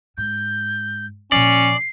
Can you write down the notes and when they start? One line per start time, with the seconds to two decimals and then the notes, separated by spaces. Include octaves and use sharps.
0.18 G#2 G6
1.32 A#2 F3 C#4 D5 C7